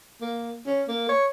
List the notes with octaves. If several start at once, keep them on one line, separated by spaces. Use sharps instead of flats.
A#3
C#4
A#3
C#5